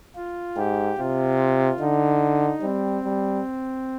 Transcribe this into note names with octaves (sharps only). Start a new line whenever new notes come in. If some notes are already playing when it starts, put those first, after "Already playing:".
F4
G#2 G4
C3 F4
D3 D#4
G3 C4
G3